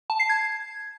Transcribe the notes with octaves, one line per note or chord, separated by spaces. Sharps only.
A5
C7
G#6